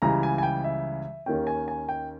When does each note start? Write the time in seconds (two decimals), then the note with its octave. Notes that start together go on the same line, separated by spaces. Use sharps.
0.02 C#2 C#3 E3 G3 A#5
0.23 G#5
0.38 G#5
0.43 G5
0.64 E5
1.26 D#2 D#3 A#3 C#4 G5
1.47 G#5
1.68 G#5
1.89 G5